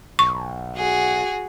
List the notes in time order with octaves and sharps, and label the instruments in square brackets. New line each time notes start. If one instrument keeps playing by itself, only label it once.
[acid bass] B1 [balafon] C#6
[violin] F#4 G#4